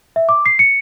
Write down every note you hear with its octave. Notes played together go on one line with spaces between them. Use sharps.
E5
D6
C7
C#7